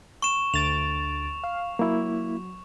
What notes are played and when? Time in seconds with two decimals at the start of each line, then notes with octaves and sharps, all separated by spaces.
0.22 C#6 E7
0.54 D2 A6 D7 F7
1.44 F5
1.79 F#3 A#3 E4